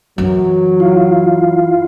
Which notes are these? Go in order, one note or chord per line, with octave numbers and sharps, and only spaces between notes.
F#2 E3 F#3
E4 F4 F5